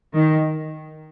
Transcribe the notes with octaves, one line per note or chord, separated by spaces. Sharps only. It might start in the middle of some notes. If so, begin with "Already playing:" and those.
D#3